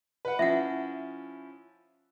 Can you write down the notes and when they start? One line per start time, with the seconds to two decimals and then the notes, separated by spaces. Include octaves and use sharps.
0.25 B4 F#5
0.39 F3 C#4 E4 E5 F#5